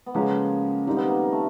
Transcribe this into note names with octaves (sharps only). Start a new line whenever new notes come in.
B3
C#3 F3 G#3 A#3 C#4
D#3 G3 A#3 C4 D#4
B3
A#3
A#3
A3